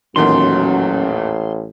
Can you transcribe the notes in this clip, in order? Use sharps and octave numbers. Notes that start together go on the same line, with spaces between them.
A1 E2 A#2 D#3 F#3 C#4 C6